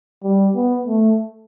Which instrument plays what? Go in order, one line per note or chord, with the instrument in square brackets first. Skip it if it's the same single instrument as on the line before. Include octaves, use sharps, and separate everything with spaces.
[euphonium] G3
B3
A3